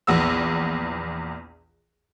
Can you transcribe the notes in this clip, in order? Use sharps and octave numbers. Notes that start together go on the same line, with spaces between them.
A#1 E2 B3 E6